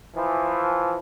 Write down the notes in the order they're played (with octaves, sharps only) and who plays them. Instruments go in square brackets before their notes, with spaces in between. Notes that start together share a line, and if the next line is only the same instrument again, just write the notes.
[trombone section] E3 F3